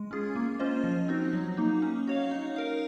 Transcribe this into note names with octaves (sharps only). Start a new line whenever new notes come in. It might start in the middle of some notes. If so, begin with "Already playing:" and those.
Already playing: G#3
C#4 F4 G#4
A#3
C#4 F4 C5 D#5
F3
C4 D#4 F#4
F#3
A#3 D#4
C#4
F#4 C#5 F5
D#4
A#4 F5